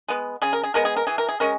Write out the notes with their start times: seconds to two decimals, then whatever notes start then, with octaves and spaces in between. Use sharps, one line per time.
0.08 G#3 B3
0.42 C#3 G#4
0.53 A#4
0.64 G#4
0.74 G#3 B3 A#4
0.85 G#4
0.97 A#4
1.07 E3 G#4
1.18 A#4
1.29 G#4
1.40 G#3 C#4 A#4